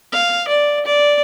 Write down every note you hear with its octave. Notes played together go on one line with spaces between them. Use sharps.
F5
D5
D5